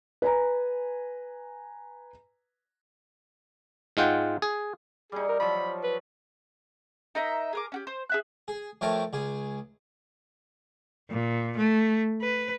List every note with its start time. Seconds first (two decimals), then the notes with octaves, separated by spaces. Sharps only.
0.22 B4 G#5 A#5
3.97 G#2 G#3 F4 F#5 G5
4.42 G#4
5.12 G3 D#4 G#4
5.29 A#4
5.40 F3 F#3 B5
5.84 B4
7.15 D#4 A#4 D#5 E5
7.53 G#4 A#4 D6
7.72 C#4 F#4 G4
7.87 C5
8.09 G#4 E5 F#6
8.48 G#4
8.81 F2 A3 A#4 C#5 G5 A5
9.13 C#2 G#4
11.10 A#2
11.57 A3
12.22 B4